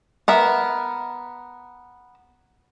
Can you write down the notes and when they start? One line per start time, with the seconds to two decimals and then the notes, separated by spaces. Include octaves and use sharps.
0.28 B3 A#4 E5